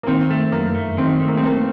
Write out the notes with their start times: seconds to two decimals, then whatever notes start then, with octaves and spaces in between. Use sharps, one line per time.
0.03 A#3
0.07 D#3 C4
0.31 A3
0.52 F#2 A#3
0.75 A3
0.97 D#3 C4
1.20 A3
1.28 A#3
1.37 C4
1.43 A3 A#3